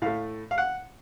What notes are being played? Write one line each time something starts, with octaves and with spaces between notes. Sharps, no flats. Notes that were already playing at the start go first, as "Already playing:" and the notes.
A2 A3 F5
F5
F#5